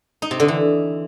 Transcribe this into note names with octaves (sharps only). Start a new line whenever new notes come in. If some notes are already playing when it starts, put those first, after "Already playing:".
D#4
C3
D3
E3